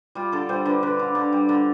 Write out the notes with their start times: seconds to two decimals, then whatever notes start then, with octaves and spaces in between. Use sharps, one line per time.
0.15 G3 F4
0.32 D3 A4
0.49 G3 C5
0.66 D3 B4
0.83 D3 B4
0.99 D3
1.15 D3
1.33 G3
1.49 D3